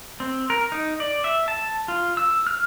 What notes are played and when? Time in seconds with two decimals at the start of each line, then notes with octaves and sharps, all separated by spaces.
0.20 C4
0.50 A#4
0.72 D#4
1.00 D5
1.24 E5
1.48 A5
1.88 F4
2.17 E6
2.47 F6